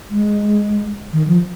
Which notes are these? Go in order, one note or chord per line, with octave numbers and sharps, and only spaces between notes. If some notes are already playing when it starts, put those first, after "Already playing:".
G#3
D#3
F3